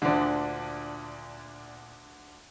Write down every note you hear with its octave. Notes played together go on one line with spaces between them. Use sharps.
D2 A#2 D3 D4